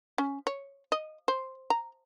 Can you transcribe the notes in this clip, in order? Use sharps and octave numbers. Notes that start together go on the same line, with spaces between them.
C#4
C#5
D#5
C5
A#5